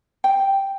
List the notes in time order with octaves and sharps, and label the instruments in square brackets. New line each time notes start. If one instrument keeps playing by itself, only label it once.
[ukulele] G5